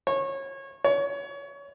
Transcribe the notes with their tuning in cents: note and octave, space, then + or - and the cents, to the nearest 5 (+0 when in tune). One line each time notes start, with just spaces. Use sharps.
C#5 -25
C#5 +25